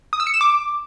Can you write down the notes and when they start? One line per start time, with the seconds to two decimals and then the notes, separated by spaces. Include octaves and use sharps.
0.13 D#6
0.20 E6
0.27 C#7
0.34 E7
0.41 D6